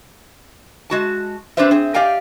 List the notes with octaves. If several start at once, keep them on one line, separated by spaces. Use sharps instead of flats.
G#3 F#4 A5
C4 D4 G4 B4 C5 E5
C4 G#4
G4 D5 D#5 F5 G5 G#5